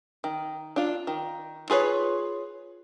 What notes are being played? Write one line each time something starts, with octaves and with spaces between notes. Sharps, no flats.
D#3
D4 F4
D#3
F4 G#4 B4 C#5